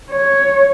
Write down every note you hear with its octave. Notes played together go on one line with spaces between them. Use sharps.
C#5